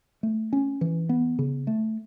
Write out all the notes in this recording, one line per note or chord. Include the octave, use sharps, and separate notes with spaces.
A3
C#4
E3
B3
C#3
A3